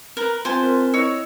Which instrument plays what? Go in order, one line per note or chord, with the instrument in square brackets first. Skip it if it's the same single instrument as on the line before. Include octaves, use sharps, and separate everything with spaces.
[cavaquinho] A#4 B4
[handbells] C4 F4 [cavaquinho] C5 G#5 A5
[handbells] C4 A#4
[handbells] E4 D#5 E6 [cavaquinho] C#5 C#6